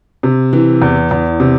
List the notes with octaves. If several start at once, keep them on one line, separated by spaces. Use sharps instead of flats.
C3
E3
E2
E2
C3